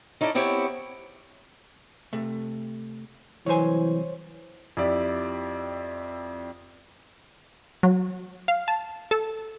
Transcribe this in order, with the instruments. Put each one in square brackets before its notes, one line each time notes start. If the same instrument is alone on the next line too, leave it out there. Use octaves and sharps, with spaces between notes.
[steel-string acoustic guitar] C#4 D#4 E4 A4 C#5 D5
B3 C4 E4 G4 C#5
[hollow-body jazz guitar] C3 A3
[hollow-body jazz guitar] C2 F#3 G#5 [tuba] E3 [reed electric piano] C5 C#5
[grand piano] F2 E4 G4 D5
[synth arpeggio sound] F#3
F5
A5
A4